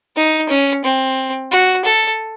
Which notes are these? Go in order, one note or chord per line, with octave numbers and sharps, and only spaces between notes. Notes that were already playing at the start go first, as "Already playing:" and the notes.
D#4
C#4
C4
F#4
A4